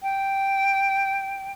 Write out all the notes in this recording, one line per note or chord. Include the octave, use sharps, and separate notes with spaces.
G5